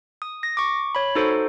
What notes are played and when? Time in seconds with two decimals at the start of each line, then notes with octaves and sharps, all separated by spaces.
0.22 D#6
0.43 A#6
0.57 C#6 D6
0.95 C#5 B5
1.15 D#4 F#4 A4 C5